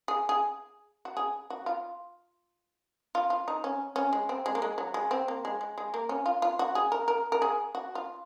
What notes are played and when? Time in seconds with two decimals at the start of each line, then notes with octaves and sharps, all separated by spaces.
0.08 G#4
0.29 G#4
1.05 F#4
1.17 G#4
1.50 F#4
1.66 F4
3.15 F4
3.30 F4
3.48 D#4
3.64 C#4
3.96 C#4
4.13 G#3
4.29 C4
4.46 G#3
4.55 A#3
4.62 G#3
4.78 F#3
4.94 G#3
5.11 C4
5.28 A#3
5.45 G#3
5.61 G#3
5.78 G#3
5.94 A#3
6.09 C#4
6.26 F4
6.42 F4
6.59 F#4
6.75 G#4
6.92 A#4
7.08 A#4
7.32 A#4
7.42 G#4
7.75 F#4
7.95 F4